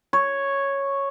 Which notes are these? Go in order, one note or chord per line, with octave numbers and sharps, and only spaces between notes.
C#5